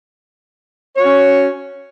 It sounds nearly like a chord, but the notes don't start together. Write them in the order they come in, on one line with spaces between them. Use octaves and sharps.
C#5 F#4 C#4